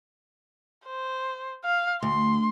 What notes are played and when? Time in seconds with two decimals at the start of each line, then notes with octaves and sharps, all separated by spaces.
0.86 C5
1.64 F5
2.02 D2 C6